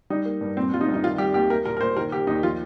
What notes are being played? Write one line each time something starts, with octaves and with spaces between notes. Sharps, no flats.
G3 D#4
A#3
G2
A#2 C4
G3 F4
D#4
C2
D#4
D#3 F4
G3 G4
D#2 G4
A#3 A#4
A#2 A#4
A#4
A#2 C5
D#3 A#4
A#3 G4
D#2 D#4
F3 F4